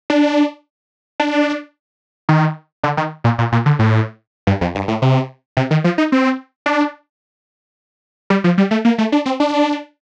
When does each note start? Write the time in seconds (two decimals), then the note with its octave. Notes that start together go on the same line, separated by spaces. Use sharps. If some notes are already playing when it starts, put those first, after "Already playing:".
0.10 D4
1.20 D4
2.29 D#3
2.83 D3
2.97 D#3
3.24 A#2
3.38 A#2
3.52 A#2
3.66 D3
3.79 A2
4.47 G2
4.61 F2
4.75 G2
4.88 A2
5.02 C3
5.57 C3
5.71 D#3
5.84 F3
5.98 D#4
6.12 C4
6.66 D4
8.30 G3
8.44 F3
8.58 G3
8.71 A3
8.85 A#3
8.98 A3
9.12 D4
9.26 C4
9.40 D4